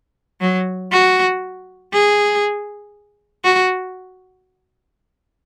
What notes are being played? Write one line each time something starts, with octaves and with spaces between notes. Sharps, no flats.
F#3
F#4
G#4
F#4